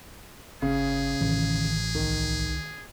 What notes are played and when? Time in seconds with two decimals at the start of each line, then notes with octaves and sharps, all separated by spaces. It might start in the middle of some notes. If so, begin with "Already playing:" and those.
0.62 G1 C#3 G#4
1.21 A1 D#3
1.95 C2 D#3